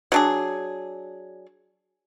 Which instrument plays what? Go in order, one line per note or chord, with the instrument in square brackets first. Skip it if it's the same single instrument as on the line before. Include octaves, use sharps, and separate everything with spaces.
[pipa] F#3 D4 G#4